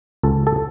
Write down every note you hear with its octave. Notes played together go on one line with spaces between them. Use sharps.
C#2 A4
A4